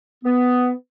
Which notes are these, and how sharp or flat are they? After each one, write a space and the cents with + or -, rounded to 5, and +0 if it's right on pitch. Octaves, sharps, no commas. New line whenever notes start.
B3 +10